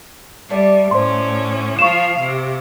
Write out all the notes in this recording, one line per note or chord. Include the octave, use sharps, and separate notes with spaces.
G3 A3 D5
A2 C#4 C5 C6
F3 F4 F5 C#6 E7
C3